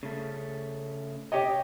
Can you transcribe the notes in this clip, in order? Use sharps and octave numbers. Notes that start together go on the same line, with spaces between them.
C#3 A3
G4 C#5 D#5